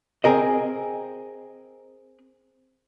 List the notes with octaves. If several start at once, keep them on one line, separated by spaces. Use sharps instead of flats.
C4 G#4 A#4 D#5